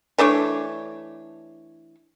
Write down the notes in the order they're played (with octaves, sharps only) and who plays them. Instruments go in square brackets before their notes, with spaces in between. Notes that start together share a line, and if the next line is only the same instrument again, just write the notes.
[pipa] E3 A3 D4 C#5